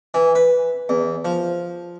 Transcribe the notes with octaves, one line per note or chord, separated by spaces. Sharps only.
E3
B4
E2
F3